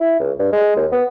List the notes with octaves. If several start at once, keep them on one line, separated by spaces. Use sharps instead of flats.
E4
C#2
G2
G#3
D#2
B3